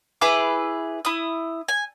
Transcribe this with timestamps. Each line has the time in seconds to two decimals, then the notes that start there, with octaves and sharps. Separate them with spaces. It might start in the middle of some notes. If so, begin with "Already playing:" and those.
0.21 E4 G#4 B4 D6
1.05 E4 D#6
1.68 G#5